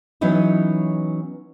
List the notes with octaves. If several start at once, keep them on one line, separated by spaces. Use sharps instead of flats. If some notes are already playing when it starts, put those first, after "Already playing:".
E3 F#3 B3 C#4 D#4 E4